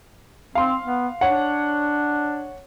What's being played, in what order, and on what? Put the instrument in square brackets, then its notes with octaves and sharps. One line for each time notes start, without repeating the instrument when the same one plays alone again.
[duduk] C4 [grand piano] F5 C6
[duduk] B3
[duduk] D4 [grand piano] C#5 F#5